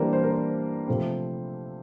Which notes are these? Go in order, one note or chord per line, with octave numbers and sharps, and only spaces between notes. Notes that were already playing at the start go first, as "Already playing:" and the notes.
Already playing: E3 G3 A#3 D4 A#4 C5
C5
A#4
C5
C3 F3 A3 C4